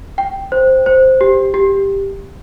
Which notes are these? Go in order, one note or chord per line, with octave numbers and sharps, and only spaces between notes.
G5
C5
C5
G4
G4